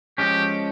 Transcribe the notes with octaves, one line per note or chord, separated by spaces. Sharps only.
F3 G#3 C#4 G4